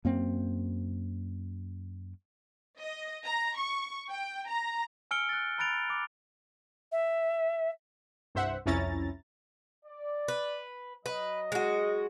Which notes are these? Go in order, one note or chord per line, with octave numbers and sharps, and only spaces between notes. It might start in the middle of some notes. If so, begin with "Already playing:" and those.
F#2 A#3 C4
D#5
A#5
C#6
G5
A#5
G#5 E6 F6 C#7 D7 G7
F#6 A6
A#5 B5 F#6 A6 D7 F7
D6
E5
C2 G2 C5 E5 F#5
C2 F2 C#4 E4 A#5 A6
D5
B4
F#3 B4 D#5
G#3 F#4